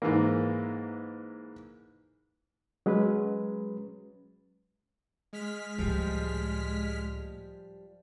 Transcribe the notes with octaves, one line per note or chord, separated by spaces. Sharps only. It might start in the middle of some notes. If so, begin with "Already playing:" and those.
G#2 E3 A#3
F#3 G#3 C#4 B4
G#3 F6 B6
C#2 A2 F3 G3